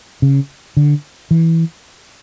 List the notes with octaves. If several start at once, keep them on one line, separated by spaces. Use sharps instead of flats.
C#3
D3
E3